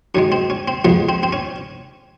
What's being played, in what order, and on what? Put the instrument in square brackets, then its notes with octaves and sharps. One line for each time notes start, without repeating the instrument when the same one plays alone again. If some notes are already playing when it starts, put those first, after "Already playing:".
[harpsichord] F#2 D#3 G#3 C#4
C4
C#4
C4
F2 C#3 F3 G#3 B3
C4
C4
C#4